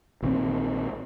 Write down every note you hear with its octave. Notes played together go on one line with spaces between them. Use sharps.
A#1 D#3 E3 C4